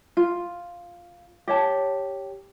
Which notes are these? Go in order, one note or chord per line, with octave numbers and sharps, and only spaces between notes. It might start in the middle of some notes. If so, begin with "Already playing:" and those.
F4
G4 C#5 A5